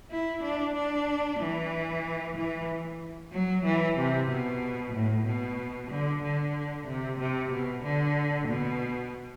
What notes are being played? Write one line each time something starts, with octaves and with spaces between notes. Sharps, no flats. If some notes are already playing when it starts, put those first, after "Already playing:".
E4
D4
D4
E3
E3
F#3
E3
C3
B2
A2
B2
D3
D3
C3
C3
B2
D3
B2